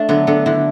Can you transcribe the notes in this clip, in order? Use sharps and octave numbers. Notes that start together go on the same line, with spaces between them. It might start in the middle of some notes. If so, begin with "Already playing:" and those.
Already playing: A3 D4
D3 F#3 B3
D3 B3
D3 E4